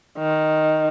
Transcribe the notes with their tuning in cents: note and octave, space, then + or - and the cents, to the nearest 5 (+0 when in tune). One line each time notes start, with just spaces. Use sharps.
D#3 +0